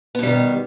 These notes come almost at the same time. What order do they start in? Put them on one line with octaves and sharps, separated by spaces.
B3 B2 G3 D#3